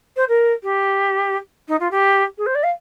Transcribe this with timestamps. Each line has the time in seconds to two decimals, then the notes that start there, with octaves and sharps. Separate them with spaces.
0.16 C5
0.28 A#4
0.63 G4
1.68 D#4
1.80 F4
1.91 G4
2.38 G#4
2.46 C5
2.55 D5
2.63 F5